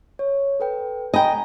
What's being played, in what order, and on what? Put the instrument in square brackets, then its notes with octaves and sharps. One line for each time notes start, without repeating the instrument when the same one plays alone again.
[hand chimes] C#5
A4 B4 G5
[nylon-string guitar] D#5 G5 [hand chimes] G#5 A#5 B5